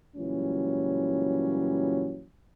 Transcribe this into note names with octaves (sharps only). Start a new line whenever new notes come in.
C#2 A#2 E3 F#3 G3 C#4